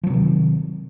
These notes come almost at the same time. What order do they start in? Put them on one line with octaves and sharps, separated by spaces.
F3 F#3 C3 D#3